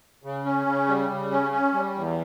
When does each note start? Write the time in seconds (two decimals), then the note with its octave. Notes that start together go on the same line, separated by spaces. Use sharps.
0.23 C#3
0.45 C#4
0.66 C#3
0.88 G3
1.09 C#3
1.31 C#4
1.52 C#4
1.73 G3
1.95 E2